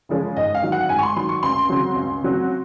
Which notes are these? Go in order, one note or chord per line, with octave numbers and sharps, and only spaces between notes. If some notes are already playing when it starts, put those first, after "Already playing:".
C#3 F3 G#3 C#4
G#2 D#5
F5
D#3 F#3
F#5
G#2 G#5
C#6
C6
D#3 F#3 C6
C#6
C#2 C6
C#3 F#3 C4
C#2
C#3 F#3 C4